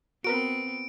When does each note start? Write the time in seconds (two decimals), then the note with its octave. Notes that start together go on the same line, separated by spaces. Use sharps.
0.24 B3 C4 F#4 A#4 B4 D7